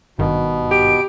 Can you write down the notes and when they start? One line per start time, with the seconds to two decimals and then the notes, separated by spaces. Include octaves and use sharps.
0.19 G#1 G2 B2 D#3
0.71 G4 D7